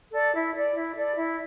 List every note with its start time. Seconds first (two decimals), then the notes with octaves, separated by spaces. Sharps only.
0.12 A4 D5
0.33 E4
0.53 A4 D5
0.74 E4
0.94 A4 D5
1.15 E4